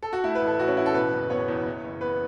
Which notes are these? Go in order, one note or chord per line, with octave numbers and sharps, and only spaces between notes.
A4
F#4
A3 E4
B4
A1
A4
A1 F#4
C#4
A2 E4
A4
B2 B4
F#1
B3 C#5
E2
E3
F#1
B3 B4